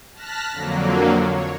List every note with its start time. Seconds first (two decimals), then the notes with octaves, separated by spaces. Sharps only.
0.14 A5 F6 F#6 A#6 B6
0.52 F2 D3 F#3 A#3
1.28 C#5